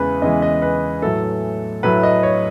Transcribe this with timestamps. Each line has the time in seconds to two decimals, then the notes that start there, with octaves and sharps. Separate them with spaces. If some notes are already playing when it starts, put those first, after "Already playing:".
Already playing: E2 C#3 E3 G#3 B4
0.21 E2 C#3 E3 G#3 D#5
0.42 D#5
0.62 B4
1.02 A2 F#3 A3 A4
1.83 A2 F#3 A3 B4
2.03 D#5
2.23 C#5